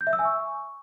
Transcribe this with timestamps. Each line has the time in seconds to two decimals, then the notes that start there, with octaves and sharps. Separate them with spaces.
0.01 G6
0.07 E5
0.13 E6
0.19 G#5
0.25 C#6